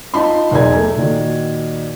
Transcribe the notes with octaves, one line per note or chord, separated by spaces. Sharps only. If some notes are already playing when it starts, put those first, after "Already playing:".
D#4 F4 A5 B5 C6
B1 E2 D#4 A#4 G#5 G#6
A3
A#2 D#3 F#4